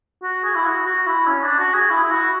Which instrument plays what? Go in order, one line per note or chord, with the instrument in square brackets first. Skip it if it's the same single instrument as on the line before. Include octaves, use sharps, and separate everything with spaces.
[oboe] F#4
G#4
E4
F#4
F#4
E4
C#4
D4
F#4
G#4
E4
E4
F#4